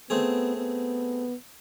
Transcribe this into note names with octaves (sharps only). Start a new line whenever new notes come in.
A3 B3 C4 G#4
B3